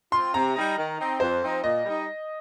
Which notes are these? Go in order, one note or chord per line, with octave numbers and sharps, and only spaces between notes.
C4 F4 C6
C3 A#5
G3 D#4
D#3
C4 D#4
F2 C5
F3 C4 D#4
A#2 D#5
G3 D#4